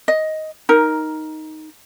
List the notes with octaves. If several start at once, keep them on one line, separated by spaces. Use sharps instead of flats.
D#5
D#4 A#4